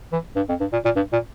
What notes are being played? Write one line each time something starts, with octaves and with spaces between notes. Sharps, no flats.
E3
G2
F2
G2
A#2
A#2
G2
A#2